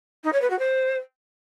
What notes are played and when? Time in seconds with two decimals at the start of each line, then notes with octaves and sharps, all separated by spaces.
0.24 D#4
0.33 C#5
0.42 B4
0.50 F#4
0.59 C5